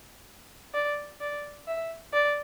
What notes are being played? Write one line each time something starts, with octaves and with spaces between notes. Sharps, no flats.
D5
D5
E5
D5